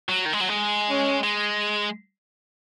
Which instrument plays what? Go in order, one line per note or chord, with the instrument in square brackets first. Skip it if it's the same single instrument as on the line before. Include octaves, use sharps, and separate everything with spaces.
[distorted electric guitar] F#3
D#3
G#3
F#3
G#3
[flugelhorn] C#4
[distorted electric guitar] G#3